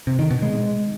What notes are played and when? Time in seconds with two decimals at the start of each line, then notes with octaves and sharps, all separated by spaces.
0.07 C3
0.19 D#3
0.31 B2
0.42 G#3